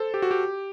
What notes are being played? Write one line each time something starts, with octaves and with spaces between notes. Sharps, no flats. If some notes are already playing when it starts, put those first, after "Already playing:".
Already playing: A4 C5
G4
F#4
G4